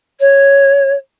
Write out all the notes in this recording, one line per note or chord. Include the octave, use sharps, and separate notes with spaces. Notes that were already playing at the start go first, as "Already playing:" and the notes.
C#5